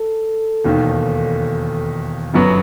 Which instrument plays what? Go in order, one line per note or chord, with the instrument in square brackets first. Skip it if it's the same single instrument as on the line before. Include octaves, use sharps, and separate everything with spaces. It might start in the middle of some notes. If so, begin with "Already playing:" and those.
Already playing: [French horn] A4
[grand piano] E1 D#2 D#3
G1 F#2 F#3 B3 F#4